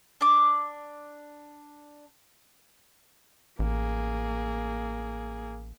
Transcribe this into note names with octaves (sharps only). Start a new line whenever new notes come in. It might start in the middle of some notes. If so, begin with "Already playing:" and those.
D4 D6
A1 A#3 G#4